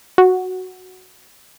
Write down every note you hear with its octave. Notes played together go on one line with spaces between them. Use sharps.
F#4